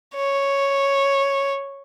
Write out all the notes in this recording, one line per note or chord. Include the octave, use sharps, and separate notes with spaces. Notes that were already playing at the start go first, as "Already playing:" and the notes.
C#5